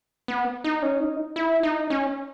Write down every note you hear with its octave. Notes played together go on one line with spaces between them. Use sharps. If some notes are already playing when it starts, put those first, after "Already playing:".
B3
D#4
C#4
D#4
E4
D#4
C#4